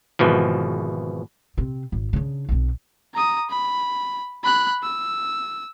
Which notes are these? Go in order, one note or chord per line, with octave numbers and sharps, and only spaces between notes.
G#1 B2 E3 F3
C3 C4
G#1
C#3 D4
B1 C4
A#5 D#6
B5
B5 F#6
E6